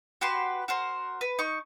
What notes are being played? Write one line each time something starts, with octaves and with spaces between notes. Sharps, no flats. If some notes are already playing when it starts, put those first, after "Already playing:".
F#4 G4 B4 C6
F#4 A#4 C5
B4
D#4 C#6